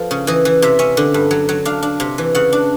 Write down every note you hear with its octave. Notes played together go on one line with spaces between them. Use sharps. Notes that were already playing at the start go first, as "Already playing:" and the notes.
Already playing: F3 A4 B4
C#3
E3 D#5
E3
C3 E5
C#4 E5
D3
G2
F#3
F#3
D4 F5
D4
C3
E3
C#3 F#5
D4